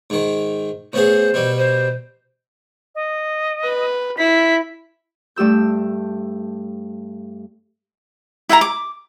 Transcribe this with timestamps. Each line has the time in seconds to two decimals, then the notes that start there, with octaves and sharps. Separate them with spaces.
0.10 G#2 D#3
0.93 A2 B3 G#4 C5
1.34 B2 G3
1.57 C5
2.95 D#5
3.64 B4
4.18 E4 B6
5.36 G2 A3 G4 E6 G6
8.49 E4 E5 F#5 A#5
8.61 D6